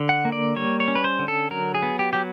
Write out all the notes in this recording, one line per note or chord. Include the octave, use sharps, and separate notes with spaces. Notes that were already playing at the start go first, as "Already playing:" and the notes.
Already playing: D3
F#5
A#3
D5
G3 C#5
C#5
C#4
B4
C5
D3
A4
F#3 A#4
G#4
B3
G4
F#3 G4